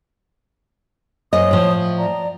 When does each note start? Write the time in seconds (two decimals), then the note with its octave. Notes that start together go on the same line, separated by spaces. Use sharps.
1.33 F#2 C5 C#5 D#5 D#6
1.51 A2 F3
1.97 D5 A#5